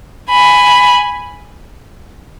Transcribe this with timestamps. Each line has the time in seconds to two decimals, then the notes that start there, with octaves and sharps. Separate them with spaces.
0.30 G#5 B5